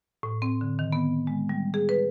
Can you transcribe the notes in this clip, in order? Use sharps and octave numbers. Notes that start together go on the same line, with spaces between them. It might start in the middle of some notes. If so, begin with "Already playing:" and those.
A2
C4
D3
D#3
B3
G#3
G3
G#4
B4